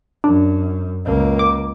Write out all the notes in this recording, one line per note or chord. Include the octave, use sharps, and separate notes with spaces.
F#2 D4
C#2 A#3
D6